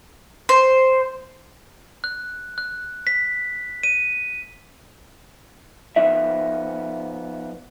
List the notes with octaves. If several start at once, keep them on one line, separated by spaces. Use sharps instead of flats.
C5
F#6
F#6
B6
D#7
F3 B3 D#4 E5